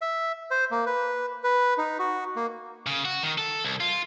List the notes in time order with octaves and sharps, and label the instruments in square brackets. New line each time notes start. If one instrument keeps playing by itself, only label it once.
[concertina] E5
C5
A#3
B4
B4
D#4
F#4
A#3
[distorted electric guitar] C#3
F#4
D#3
A4
C2
F4